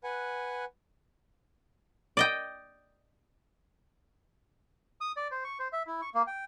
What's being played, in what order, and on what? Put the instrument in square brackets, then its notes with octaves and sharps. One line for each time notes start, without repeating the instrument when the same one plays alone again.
[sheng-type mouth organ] B4 F#5 G#5
[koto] D5 D#5 G5
[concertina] D#6
D5
C5
C#6
C5
E5
E4
C#6
A#3
G5